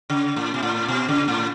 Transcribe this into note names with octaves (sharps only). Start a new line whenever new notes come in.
C#3
A2
B2
A2
B2
C#3
A2